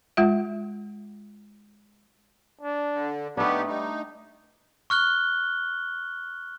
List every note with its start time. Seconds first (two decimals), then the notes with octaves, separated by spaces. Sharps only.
0.17 G#3 F4 E5
2.61 D4
2.92 D3
3.37 A3 B3 D4 D#4 G4
3.67 G3 D#4
4.90 C#6 F6 F#6 G7